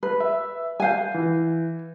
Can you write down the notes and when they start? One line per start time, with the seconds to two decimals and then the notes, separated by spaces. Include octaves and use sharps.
0.03 B4
0.20 E5
0.80 F5 F#5 G#5 G6
1.14 E3